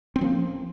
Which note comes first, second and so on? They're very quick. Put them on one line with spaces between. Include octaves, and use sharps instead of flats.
C4 C#4 F3 A#3